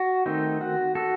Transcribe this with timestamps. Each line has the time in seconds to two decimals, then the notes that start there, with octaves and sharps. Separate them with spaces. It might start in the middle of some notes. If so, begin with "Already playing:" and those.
Already playing: F#4
0.26 D#3 A3 C4 D#4
0.61 F#4
0.95 F#4 A4